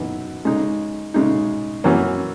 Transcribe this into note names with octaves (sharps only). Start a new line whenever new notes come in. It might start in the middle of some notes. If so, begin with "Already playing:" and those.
Already playing: F#2 E3 B3 D#4
C#3 G#3 D#4
C#3 G#3 D#4
F#2 E3 A#3 C#4